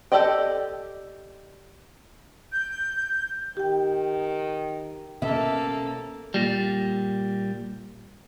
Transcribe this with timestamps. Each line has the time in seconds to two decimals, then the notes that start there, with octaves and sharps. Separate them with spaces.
0.12 G4 A4 D5 D#5 G5
2.52 G6
3.57 D#3 G4 G5
5.22 B2 A#3 B3 C#4 A4 E5
6.34 A#2 G3